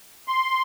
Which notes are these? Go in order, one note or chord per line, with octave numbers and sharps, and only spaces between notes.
C6